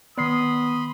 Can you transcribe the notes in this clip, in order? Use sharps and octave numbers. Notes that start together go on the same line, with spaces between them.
D#3 B3 D5 B5 C6 D#6 C7